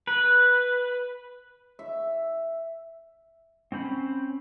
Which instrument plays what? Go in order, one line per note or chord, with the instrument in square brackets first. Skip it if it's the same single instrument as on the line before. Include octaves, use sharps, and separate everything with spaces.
[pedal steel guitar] B4
[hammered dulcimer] E5
[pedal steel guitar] C4 C#4 C5 B5